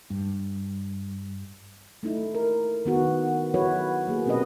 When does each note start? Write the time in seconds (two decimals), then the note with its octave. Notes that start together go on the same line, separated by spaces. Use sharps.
0.10 G2
2.03 A3 D#4 E4
2.35 A#4
2.85 D#3 B3 F#4
3.54 F#3 E4 F#4 B4 C#5
4.07 F#3 A#3 G#4
4.26 B2 C4 C#4 G4 B4 D#5